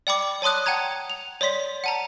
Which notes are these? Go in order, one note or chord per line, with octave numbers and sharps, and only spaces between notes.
D5 G5 B5 D6
C#5 A5 C6 D#6 F#6
F#5 G5 A5 A#5 G#6
F7
C#5 D5 C6 B6
F#5 A5 A#5